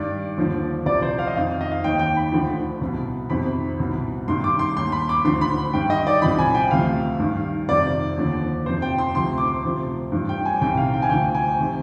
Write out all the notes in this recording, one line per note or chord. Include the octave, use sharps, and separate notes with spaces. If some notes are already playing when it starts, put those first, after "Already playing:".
Already playing: G2 D#3 D5
D#2 D3 F3
C2 C3 F3 D5
C5
F5
D#5
F2 D#3 F5
D#5
F5
D#2 D#3 G5
G5
B5
D2 D3 F3
C2 B2
F2 C3 D#3 B5
C2 B2
G2 D#3 C6
D6
C6
D#2 D#3 C6
B5
D6
D2 D3 F3 C6
B5
G2 D#3 G5
D#5
D5
C2 C3 F3 B5
G#5
G5
D2 C3 F3 F5
G2 D#3
F2 C3 D#3 D5
D#2 D3 F3
F2 C3 F3 C5
G5
C6
D2 C3 F3 C6
D6
C6
D2 C3 F3
G2 F3
G5
G#5
C2 C3 D#3 G5
F5
G5
G#5
D2 D3 F3 G5
G#5
C3 D#3